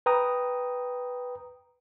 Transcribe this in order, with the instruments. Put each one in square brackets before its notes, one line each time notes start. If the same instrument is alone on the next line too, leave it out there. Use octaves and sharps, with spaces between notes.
[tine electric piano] B4 G5 A#5 D#6